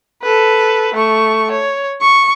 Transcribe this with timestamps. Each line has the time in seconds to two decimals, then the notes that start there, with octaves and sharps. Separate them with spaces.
0.22 A4 B4
0.94 A3 C#6
1.51 C#5
2.01 C#6